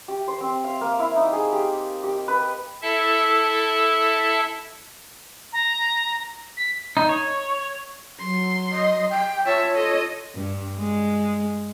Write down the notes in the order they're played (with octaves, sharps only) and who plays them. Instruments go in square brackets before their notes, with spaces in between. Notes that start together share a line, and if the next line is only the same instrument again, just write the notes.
[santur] G4
C5
C4
F5
A#3
E4
D#4
G#4
G4
G4
B4
[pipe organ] E4 A4 E5 A5
[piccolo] A#5
B6
[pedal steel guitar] D#4
C#5
[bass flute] F#3 [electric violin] C6
[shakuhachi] D#5
G5
[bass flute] F4 [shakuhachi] C#5 [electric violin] E5 A5
[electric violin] A4 D#5
[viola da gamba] G2
G#3